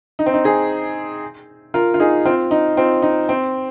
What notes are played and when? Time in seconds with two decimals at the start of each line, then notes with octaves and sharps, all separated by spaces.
0.19 D#4
0.26 C4
0.34 D#4
0.44 D#4 G#4
1.74 F4 A#4
1.94 F4
2.00 D#4 G#4
2.25 C4 F4
2.51 D#4
2.77 C4 F4
3.02 D#4
3.29 C4